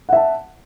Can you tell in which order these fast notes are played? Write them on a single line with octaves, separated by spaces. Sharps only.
F#5 E5 A5